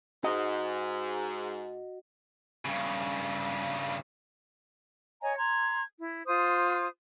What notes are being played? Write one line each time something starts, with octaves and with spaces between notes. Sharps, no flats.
G#2 F#4 D#5
G2 C#3
C#5 D#5 G#5 A#5
A#5 C6 G#6
E4
F4 C5 D#6